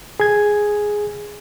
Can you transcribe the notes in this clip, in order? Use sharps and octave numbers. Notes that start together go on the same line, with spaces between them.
G#4 G#6